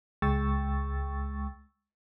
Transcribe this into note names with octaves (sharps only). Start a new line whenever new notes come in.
C#2 G#3 G5 C#6 E6 A6